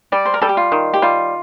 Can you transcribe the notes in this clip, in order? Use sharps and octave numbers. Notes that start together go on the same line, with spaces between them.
G3 D5
C5
A#4
G3 A4
G4
F4
D#3
G4
G3 F4